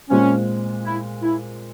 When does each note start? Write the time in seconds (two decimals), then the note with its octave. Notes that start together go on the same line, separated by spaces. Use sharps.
0.10 A#2 G#3 C4 C#4
0.85 E4
1.22 E4